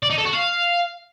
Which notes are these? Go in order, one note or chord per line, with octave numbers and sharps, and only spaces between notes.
D5
D#4
A4
F#4
F5